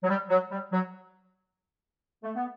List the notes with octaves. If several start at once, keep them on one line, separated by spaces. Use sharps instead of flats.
F#3
G3
F#3
G3
F#3
A3
B3